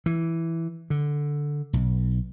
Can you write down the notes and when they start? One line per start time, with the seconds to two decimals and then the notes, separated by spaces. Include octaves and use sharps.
0.06 E3
0.90 D3
1.73 B1